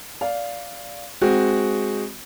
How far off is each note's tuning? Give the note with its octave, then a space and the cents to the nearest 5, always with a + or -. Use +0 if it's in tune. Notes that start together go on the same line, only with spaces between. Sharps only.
D5 -15 F5 +0
G#3 +0 C4 +0 F#4 +0